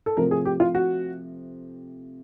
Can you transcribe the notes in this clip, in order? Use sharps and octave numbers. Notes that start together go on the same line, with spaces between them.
A4
C3 F3 A3 C4 A#4
G#4
G4
F4
F#4